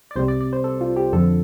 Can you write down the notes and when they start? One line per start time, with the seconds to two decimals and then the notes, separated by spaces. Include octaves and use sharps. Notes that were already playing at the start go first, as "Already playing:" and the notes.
0.11 D5
0.16 C2 C3 G3 C5
0.28 D5
0.41 D5
0.53 C5
0.64 A4
0.81 F4
0.96 G4
1.12 F2 D3 F3 A4